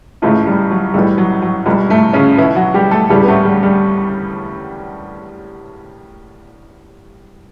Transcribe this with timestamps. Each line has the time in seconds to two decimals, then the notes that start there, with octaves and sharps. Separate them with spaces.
0.22 C#2 A2 C#3 E3 A3
0.47 G3
0.71 F#3
0.94 B1 A2 E3 G3
1.18 F#3
1.42 F#3
1.66 C#2 B2 G3
1.89 A2 A3
2.13 C#3 C#4
2.37 B1 B2 E3 E4
2.55 F#3 F#4
2.74 G3 G4
2.91 A3 A4
3.09 E1 D2 C#3 E3 G3 G4
3.23 B3
3.28 A2 A3
3.45 G3
3.63 G3